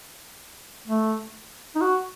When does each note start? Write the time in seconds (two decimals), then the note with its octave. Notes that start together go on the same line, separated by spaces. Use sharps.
0.88 A3
1.76 D#4
1.81 F#4